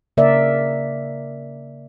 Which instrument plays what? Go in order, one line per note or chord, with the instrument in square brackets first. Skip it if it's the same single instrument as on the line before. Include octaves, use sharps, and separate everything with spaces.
[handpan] C#3 A#3 A#4 D5 E5